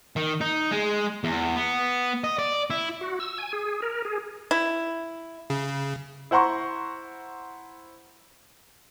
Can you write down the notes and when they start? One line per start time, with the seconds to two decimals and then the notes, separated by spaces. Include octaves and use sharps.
0.16 D#3
0.41 D#4
0.72 G#3
1.24 E2
1.56 B3
2.24 D#5
2.39 D5
2.70 E4
3.01 F#4
3.20 E6
3.38 G#5
3.53 G#4
3.82 A#4
4.05 G#4
4.51 E4
5.50 C#3
6.31 E4 C5 F#5 A#5 C6 C#6